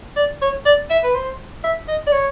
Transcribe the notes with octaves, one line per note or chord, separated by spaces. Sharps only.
D5
C#5
D5
E5
B4
C5
E5
D#5
D5
C#5